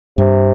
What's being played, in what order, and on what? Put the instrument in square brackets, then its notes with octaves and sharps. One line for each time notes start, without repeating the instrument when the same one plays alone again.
[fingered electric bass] G2 [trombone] C3